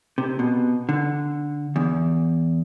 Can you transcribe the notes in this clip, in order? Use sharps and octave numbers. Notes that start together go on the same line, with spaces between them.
C3
B2
D3
E2